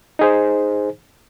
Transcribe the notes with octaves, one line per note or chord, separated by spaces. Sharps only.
D#4 G#4 C5